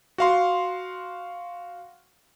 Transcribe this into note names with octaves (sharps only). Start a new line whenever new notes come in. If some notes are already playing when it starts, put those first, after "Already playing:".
F#4 F5 C6